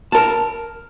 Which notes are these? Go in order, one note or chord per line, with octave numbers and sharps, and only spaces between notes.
A#4 A5